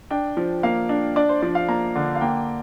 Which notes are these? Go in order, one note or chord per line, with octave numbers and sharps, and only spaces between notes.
D4 G5
F3
A#3 F5
D4
D4 D5
C5
F3 D5
F5
A#3 A#5
D3
F5
A#3 G5